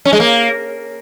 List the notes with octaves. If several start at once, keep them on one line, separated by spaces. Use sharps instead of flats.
C#4
G#3
A#3